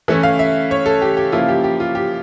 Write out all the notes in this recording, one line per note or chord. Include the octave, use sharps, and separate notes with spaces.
E3 A3 C#4 E4
F5
E5
C#5
A4
G4
G4
C#3 F3 A#3 E4 F4
G4
G4
F4
G4